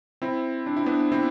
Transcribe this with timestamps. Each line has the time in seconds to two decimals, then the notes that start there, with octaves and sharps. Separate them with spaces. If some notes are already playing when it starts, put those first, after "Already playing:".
0.22 C4 E4
0.66 D4
0.77 E4
0.86 B3 D4
1.12 C4 E4